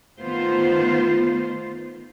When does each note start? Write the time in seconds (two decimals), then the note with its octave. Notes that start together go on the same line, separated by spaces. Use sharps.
0.20 D#3 A3 B3 F4 C5